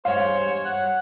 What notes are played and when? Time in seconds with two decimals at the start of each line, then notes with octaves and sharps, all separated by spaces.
0.05 E2 G2 G#3 C5 C#5 F5
0.65 F#5